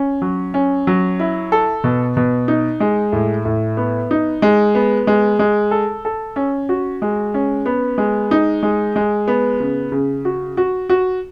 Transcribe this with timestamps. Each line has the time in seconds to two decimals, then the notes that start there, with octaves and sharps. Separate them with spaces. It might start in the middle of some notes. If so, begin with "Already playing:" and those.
Already playing: C#4
0.22 F#3
0.54 C#4
0.87 F#3
1.19 E4
1.52 A4
1.84 B2
2.17 B2
2.48 D#4
2.80 G#3
3.13 A2
3.45 A2
3.77 B3
4.11 D#4
4.42 G#3
4.75 B3
5.07 G#3
5.39 G#3
5.71 A4
6.05 A4
6.36 C#4
6.69 F#4
7.02 G#3
7.34 C#4
7.66 B3
7.98 G#3
8.31 D#4
8.63 G#3
8.96 G#3
9.28 B3
9.60 C#3
9.92 C#3
10.25 F#4
10.57 F#4
10.89 F#4